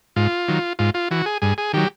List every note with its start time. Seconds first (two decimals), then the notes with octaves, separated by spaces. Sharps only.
0.16 G#2 F4
0.48 D#3 F#3
0.79 G#2 F4
0.94 F4
1.11 E3 F#4
1.26 G#4
1.42 G2 G#4
1.58 G#4
1.73 D#3 F#3 G4